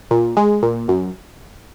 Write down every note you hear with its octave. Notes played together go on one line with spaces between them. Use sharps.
A#2
G#3
A#2
F#2